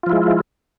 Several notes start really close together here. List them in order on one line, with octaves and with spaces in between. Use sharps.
F4 F3 E4 G#3